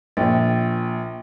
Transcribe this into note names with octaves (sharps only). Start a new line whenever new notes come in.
A#1 F4 G5 A6